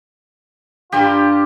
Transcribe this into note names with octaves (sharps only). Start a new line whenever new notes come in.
G2 D4 F4 G4 A#4